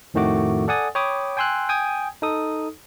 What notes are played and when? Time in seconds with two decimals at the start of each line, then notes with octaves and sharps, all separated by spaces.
0.14 F2 A2 D#3 A3 F#4 D6
0.68 A4 D5 F#5 G#5 D#6 A6
0.95 C#5 G5 B5 D6 D#6
1.37 G5 G#5 C6 E6 F#6
1.69 G5 G#5 D#6 G#6
2.22 D#4 A4 D#6